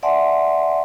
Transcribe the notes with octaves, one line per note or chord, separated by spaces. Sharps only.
D5 E5 F#5 G#5 A5 C6